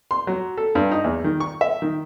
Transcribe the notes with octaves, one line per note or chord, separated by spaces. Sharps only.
C6
F#3
A4
G2
D#4
E2
D#3
C#6
E5
D#3